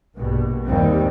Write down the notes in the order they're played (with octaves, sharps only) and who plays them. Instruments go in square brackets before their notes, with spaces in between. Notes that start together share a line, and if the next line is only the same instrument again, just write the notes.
[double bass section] A#1 G2 B2
D#2 G3 C4